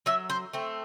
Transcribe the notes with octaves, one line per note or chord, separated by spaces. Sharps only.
F#3 E5
C5
A3 C4